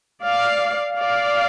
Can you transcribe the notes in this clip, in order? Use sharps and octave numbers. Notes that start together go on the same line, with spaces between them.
D5 F5
D5 F5